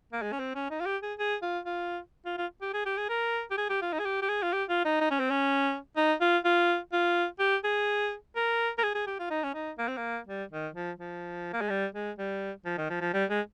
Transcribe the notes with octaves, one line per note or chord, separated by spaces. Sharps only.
A#3
G#3
C#4
C4
C#4
D#4
F4
G4
G#4
G#4
F4
F4
F4
F4
G4
G#4
G4
G#4
A#4
G4
G#4
G4
F4
D#4
G#4
G4
G4
G#4
F4
G4
F4
D#4
D#4
C#4
C4
C#4
D#4
F4
F4
F4
G4
G#4
A#4
A#4
G#4
G#4
G4
F4
D#4
C#4
D#4
A#3
C4
A#3
G3
D#3
F3
F3
A#3
G#3
G3
G#3
G3
F3
D#3
F3
F3
G3
G#3